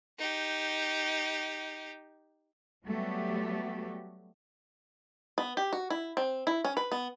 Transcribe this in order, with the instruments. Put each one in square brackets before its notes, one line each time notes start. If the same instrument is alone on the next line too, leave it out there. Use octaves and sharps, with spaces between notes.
[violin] D#4 G4
[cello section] F#3 G3 A3 B3 F#4 G4
[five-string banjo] B3
G4
F#4
E4
C4
E4
C#4
B4
B3